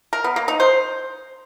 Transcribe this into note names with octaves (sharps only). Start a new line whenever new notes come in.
A#4
B3
A#3
D#4
C5